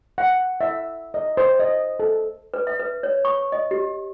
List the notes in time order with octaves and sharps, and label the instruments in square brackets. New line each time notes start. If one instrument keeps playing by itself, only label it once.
[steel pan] F#5
E5
D#5
C5
D#5
A4
[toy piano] B4
E5
B4
C#5
C#6
D#5
G4